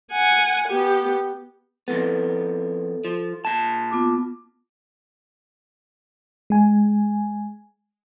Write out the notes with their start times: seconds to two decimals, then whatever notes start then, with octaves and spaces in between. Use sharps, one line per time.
0.12 F#5 G#5
0.68 B3 G4
1.88 F2 G#2 B3 A4
3.05 F3
3.45 A#2 A5
3.91 B3 F4 D6
6.50 G#3 G#5